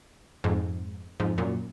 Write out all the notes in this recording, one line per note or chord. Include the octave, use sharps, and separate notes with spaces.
F2 G#2
F2 G#2
F#2 A#2